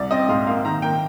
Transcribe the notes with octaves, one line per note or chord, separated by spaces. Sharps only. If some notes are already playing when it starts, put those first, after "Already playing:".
Already playing: C2 D5
C4 D#5
G#2 F5
A#3 F5
D#3 A#5
A#3 G5